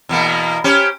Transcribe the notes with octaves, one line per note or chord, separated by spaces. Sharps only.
E2 B2 A#3
C#4 G4 C5